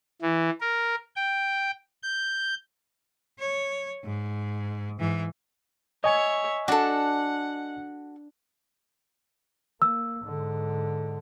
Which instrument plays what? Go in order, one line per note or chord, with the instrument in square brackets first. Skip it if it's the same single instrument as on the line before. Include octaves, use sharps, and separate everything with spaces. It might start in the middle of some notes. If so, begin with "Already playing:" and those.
[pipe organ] E3
A#4
G5
G6
[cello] C#5
G#2
G#2 E3
[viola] C#5 E5 [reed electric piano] D#5 G#5
[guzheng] D4 [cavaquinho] F#4 A4 [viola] F#5
[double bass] A#3 [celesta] E6
[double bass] G#2 D3